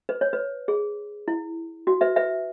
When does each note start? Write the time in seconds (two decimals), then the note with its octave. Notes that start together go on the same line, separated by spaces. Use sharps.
0.09 B4
0.21 C#5
0.33 B4
0.68 G#4
1.28 E4
1.87 F#4
2.01 B4 E5
2.16 B4 E5